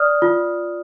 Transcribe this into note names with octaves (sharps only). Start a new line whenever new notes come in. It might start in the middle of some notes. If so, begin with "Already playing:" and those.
Already playing: D5 D#6 F6
F4